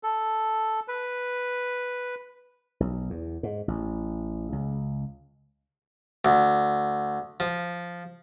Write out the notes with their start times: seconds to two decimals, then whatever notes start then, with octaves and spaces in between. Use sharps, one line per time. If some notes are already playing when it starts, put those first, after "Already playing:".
0.03 A4
0.88 B4
2.80 B1
3.10 E2
3.43 G#2
3.68 A1
4.52 C#2
6.25 D2
7.40 F3